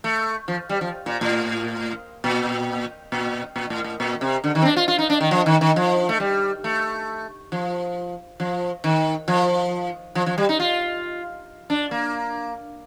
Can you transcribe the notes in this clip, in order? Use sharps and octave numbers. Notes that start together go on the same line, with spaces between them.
A3
F3
G3
F3
A#2
A2
A#2
A#2
A#2
A2
A2
A#2
C3
D3
D#3
C4
D4
F4
F4
D#4
D4
D#3
F3
D#3
D#3
F3
A3
G3
A3
F3
F3
D#3
F3
F3
F3
G3
D#4
F4
D4
A#3